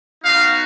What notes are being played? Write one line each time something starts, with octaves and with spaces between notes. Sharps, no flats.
B3 D#4 F#4 F5